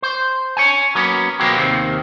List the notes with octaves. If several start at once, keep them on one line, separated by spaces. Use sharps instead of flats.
C5
C#5 G#5
F#3 A#3 B3 C#4
B2 F#3 G#3 A#3 C4 G4
D#2 C3 D#3